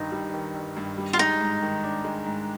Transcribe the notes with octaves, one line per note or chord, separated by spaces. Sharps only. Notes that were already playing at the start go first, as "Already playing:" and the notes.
Already playing: G1 G2 D#3 D#4
G3
D#3
G1
G2
G3
F4
G#3 D#4
G#2
D#3
D4
G#3
G#2